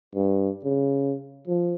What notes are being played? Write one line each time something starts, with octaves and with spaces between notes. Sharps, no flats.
G2
C#3
F3